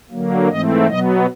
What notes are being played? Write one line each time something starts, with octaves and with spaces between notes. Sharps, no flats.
D3 F#3 A#3
G#2 E3 A3 C4 D#5
B2 F#3 B3 D#5